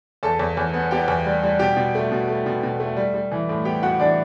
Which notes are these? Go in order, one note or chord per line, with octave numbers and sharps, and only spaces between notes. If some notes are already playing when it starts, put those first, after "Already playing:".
E2 A4 A5
E2
E2
B3
B3 G4 G5
E2
G3
G3
B2 G4 G5
B2
A3
B2
A3
B2
B2
A3
G3
G3
E3
A2
B3 G4 G5
B3 F#4 F#5
E3 D4 D5